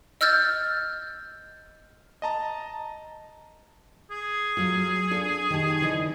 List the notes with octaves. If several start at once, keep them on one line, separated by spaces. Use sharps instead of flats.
D#5 E6 F6 G6 A6
D#5 A5 A#5
G#4
F#3 A3 F4
D4 F4 A4
D#3 G4 A5
D3 E3 D#4